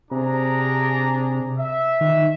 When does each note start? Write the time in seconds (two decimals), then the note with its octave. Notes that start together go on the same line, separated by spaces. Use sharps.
0.11 C3 D4 G#4 A#5
1.58 E5
2.01 D#3